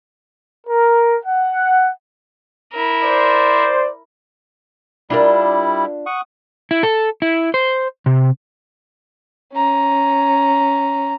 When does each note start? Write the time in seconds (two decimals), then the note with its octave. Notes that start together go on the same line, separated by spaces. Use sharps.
0.67 A#4
1.25 F#5
2.73 E4 A#4
3.04 C5 D5
5.10 G3 D4 E4 F4 A#4
6.06 F#5 C#6 D#6
6.71 E4
6.83 A4
7.22 E4
7.54 C5
8.06 C3
9.53 C#4 A#5